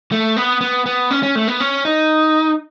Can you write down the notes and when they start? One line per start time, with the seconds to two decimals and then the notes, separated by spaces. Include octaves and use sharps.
0.12 A3
0.37 B3
0.61 B3
0.86 B3
1.11 C#4
1.23 C#4
1.35 A3
1.48 B3
1.60 C#4
1.85 D#4